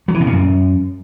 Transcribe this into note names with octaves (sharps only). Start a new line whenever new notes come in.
F#3
E3
B2
A#2
F#2